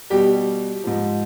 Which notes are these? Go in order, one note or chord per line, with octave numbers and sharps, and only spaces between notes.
B2 G3 G4
G#2 F3